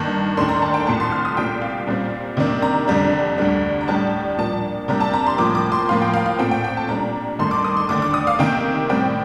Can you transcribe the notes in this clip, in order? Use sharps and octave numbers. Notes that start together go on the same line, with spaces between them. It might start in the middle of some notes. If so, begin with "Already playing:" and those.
Already playing: G2 D#3 A#3
D#2 D#3 A3 D4 C6
A#5
A5
G5
C2 A#2 A3 A5
C6
F6
D#6
C2 A#2 G3 G5
F5
A#2 G3 C4
C3 D#3 A#3 D4
A#5
F2 D3 G3 D4
D2 D3 G3 D4
A#5
A2 G3 D4 A5
A#2 F3 A#3 D4 A5
C3 G3 A#3 D4 A#5
A5
A#5
C6
A2 F3 A#3 D6
D6
C6
A2 F3 A#3 F5
G5
F5
F5
A#2 A3 C4 G5
G5
G5
A5
A#2 G3 D4 A#5
G2 D#3 A3 C6
D6
D#6
C6
D#2 D3 A3 D4 D6
D6
D#6
F5
C3 D#3 A#3 G5
A2 G3 C4 G5